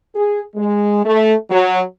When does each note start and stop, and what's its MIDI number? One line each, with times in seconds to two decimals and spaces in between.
0.16 0.40 68
0.55 1.01 56
1.05 1.34 57
1.50 1.81 54